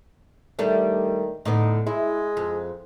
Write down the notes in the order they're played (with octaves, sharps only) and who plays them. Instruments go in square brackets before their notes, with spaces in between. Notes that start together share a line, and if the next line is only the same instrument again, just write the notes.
[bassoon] D#3 [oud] G3 A3 D4
[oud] A2 D3 B3 [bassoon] D#4
[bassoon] G#3 [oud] E4
[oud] F2